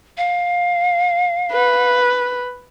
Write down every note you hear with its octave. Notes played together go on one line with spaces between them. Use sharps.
F5
B4